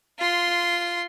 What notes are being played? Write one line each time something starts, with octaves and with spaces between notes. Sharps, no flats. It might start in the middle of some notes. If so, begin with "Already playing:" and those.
F4 C6